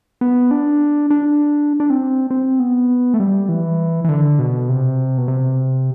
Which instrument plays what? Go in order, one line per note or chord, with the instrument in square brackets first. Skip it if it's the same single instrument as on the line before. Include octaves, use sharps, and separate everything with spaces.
[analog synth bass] B3
D4
D4
D4
C4
C4
B3
A3
G3
E3
E3
D3
B2
C3
B2
C3